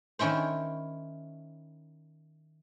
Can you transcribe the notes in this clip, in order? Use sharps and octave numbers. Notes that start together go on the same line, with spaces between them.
D#3 C#4 E4 C5